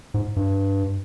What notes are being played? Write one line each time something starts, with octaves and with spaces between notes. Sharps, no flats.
G#2
G2